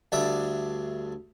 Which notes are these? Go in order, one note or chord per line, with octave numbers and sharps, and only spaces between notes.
D2 G2 D4 E5